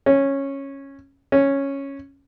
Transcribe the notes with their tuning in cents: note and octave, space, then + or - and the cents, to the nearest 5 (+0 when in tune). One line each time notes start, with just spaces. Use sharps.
C#4 -10
C#4 -5